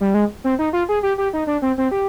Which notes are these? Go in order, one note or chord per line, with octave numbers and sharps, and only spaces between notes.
G3
G#3
C4
D#4
F4
G#4
G4
G4
D#4
D4
C4
C4
G4